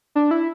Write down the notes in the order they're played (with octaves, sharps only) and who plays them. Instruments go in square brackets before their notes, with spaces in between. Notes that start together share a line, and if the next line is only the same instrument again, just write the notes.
[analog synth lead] D4
E4